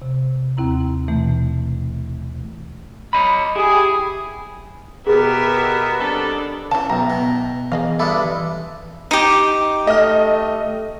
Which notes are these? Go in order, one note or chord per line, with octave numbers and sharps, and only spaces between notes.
C3
D#2 C4 E4 A#5
B2 E3 A3
C#5 D#5 B5
E4 G4 G#4
B2 B3 G4 G#4 A#4 E5
G3 C4 D4 A4 D6
C#3 E3 A5
B1 E5 G5 A#5
B2
E3 G#4 D#5 F5
G2 G#3 A4 E5 B5 D6
D#4 G4
A3 D#5 F6